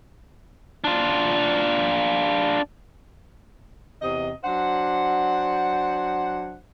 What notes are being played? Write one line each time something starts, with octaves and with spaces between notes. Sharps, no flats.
D4 F4
E2 C3 D#5
F#3 D4 C5 F#5